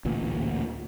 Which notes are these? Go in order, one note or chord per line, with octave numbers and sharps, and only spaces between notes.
A1 D2 A#2 E3